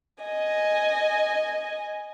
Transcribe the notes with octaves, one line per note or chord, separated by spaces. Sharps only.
D#5 G#5